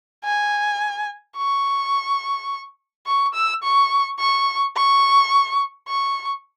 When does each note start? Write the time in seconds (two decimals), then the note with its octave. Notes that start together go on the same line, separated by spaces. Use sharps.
0.24 G#5
1.37 C#6
3.07 C#6
3.34 E6
3.63 C#6
4.19 C#6
4.76 C#6
5.88 C#6